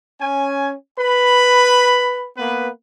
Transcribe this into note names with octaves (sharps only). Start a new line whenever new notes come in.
C#4 G#5
B4 B5
A#3 B3 B4